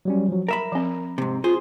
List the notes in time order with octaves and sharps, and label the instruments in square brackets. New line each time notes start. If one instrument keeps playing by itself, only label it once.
[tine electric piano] F#3 G3 C#4
F3 F#3
[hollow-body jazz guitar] A#4 E5 B5 [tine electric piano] A#5
[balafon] F3 C4
[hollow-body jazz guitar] G#2 C3
[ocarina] F4 [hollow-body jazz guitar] G#4 C5